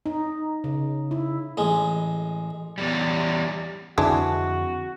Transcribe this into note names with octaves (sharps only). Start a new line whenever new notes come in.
D#4
C#3
E4
A1 G#3
E2 G3
F2 D3 E3 G#3 C4 D4 F#4